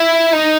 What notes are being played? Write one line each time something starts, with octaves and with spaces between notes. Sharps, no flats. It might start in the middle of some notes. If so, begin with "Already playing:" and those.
Already playing: E4
D#4